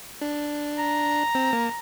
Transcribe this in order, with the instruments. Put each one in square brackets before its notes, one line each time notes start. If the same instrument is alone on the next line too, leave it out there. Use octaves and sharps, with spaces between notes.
[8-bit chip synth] D4
[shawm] A#5
[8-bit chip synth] C4
A#3